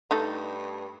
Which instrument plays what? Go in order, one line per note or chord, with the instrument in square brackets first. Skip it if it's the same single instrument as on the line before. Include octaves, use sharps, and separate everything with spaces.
[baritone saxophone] G2 [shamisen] A3 D#4 A4